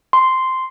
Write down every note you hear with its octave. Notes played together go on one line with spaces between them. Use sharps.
C6